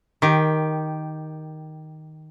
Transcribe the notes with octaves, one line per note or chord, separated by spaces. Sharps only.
D#3 G4